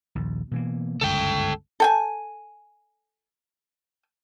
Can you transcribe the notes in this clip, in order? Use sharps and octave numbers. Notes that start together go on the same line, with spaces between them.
A#1 D#2
B2 E3 A#3
G1 C#2 F#2 A4 G5
A4 G5 G#5